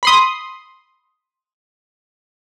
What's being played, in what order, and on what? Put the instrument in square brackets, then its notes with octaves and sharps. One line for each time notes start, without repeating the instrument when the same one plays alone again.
[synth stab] B5 C6 D#6